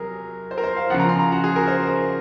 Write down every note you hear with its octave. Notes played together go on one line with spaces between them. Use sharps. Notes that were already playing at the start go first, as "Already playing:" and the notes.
Already playing: C3 F#3 G#4 A#4
C5
A#4
C5
F5
C#3 F3 F#5
A#5
C6
A#5
F#4
G#4
A#4
C5
A#4